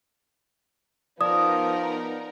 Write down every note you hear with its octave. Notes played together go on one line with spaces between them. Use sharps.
F3 B3 D#4 A#4 D5 D#6